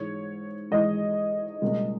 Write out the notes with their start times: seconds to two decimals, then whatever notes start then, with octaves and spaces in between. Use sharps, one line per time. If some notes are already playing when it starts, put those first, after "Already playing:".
Already playing: G#2 E3 G#3 C#5
0.71 G#2 E3 G#3 D#5
1.62 C#2 B2 G3 A#3